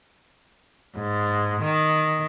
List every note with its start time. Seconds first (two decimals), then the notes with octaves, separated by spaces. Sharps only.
0.96 G#2
1.62 D#3